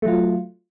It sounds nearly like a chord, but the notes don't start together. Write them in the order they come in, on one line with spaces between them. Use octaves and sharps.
A3 F#3 F4